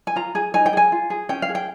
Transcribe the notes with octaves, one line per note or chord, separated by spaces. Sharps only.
G#5
F4 A#5
G#4 G#5
D#4 G#5
G5
G#4 G#5
F4
G#4
C#4 G5
F5
G#4
G5